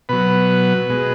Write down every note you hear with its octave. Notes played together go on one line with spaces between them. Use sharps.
B2 F#3 B4
B2 G#3